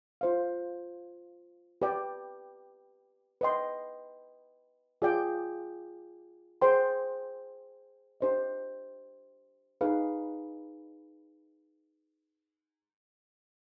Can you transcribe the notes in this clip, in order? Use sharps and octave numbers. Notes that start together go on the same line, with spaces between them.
F4 C5 F5
G4 B4 D5 G5
B4 D#5 G5 C6
F4 G#4 D5 G5
G#4 C5 G5 C6
D4 G4 C5 D#5
D#4 G#4 B4 F5